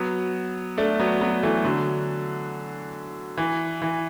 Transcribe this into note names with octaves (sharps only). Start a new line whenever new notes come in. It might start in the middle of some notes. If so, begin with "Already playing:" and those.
Already playing: F#3 B3
A3 D4
F#3 B3
F#3 B3
E3 A3
D3 F#3
E3
E3